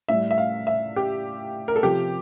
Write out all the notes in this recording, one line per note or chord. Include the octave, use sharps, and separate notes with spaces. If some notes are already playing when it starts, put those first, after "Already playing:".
A2 G3 E5
E5
F5
E5
G4
A#4
A4
C3 F3 G4